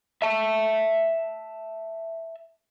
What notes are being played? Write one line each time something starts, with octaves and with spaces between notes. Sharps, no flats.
E5 A5